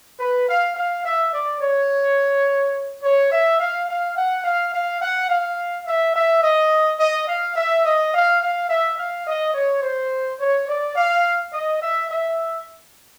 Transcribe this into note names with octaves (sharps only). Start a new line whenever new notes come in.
B4
F5
F5
E5
D5
C#5
C#5
E5
F5
F5
F#5
F5
F5
F#5
F5
E5
E5
D#5
D#5
F5
E5
D#5
F5
F5
E5
F5
D#5
C#5
C5
C#5
D5
F5
D#5
E5
E5